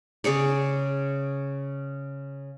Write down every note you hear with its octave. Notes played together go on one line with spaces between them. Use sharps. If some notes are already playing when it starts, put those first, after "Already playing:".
C#3 G#4 C#5 D5